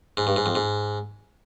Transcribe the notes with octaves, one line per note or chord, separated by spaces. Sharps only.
G#2
G2
G#2
F2
G#2